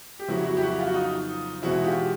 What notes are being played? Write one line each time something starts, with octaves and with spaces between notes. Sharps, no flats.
G4
F2 C#3 F#3 B3 E4 F#4
E4 F#4
G4
E4 F#4
F4
F#4
D#4 F4
E2 B2 G#3 C4 D#4 E4 F#4
F4 G4